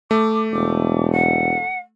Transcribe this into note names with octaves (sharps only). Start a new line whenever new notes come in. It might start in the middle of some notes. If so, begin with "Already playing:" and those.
A3 D6
E1 D6
F#5